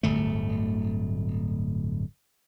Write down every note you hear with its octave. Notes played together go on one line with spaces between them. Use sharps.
D1 G1 A3